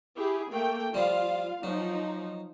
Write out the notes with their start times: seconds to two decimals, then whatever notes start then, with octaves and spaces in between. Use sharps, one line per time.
0.18 E4 G4 G#4
0.52 A3 A#3 G5
0.94 F3 G3 F4 F5
1.63 F3 F#3 D#4